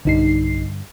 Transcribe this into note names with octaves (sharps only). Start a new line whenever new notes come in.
B1 G2 D3 D#4 C7